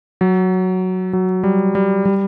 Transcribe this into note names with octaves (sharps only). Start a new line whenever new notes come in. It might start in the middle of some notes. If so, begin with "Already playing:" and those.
F#3
F#3
G3
G3
G3